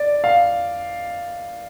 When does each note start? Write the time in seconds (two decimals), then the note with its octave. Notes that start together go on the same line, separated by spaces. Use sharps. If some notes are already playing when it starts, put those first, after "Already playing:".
Already playing: D5
0.24 F5